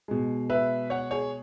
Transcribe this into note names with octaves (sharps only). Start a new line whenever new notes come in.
B2 G#3
B4 E5
C#5 F#5
G#4 C#5